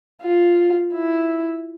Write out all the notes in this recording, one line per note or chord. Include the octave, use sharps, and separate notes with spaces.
F4
E4